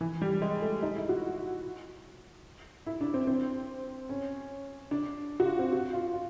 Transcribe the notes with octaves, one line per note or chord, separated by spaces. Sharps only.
E3
G3
G#3
A3
D#4
E4
F#4
E4
D4
C4
C4
C#4
D4
F#4
F4
C4
F#4
F4
F4